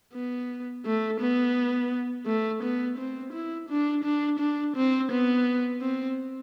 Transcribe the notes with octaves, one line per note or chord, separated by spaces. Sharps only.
B3
A3
B3
A3
B3
C4
E4
D4
D4
D4
C4
B3
C4